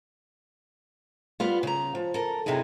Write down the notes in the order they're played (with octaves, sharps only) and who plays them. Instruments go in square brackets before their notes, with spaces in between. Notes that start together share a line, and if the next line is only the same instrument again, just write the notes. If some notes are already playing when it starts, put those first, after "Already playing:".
[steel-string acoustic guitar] G3 B3 F4
C#3 A#5
F3
A4 A#4
F#2 C3 D#4 E4 G#4